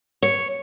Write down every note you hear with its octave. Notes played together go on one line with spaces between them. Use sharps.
C#5